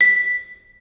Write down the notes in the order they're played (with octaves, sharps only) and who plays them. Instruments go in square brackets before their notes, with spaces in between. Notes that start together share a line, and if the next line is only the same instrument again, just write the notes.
[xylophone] B6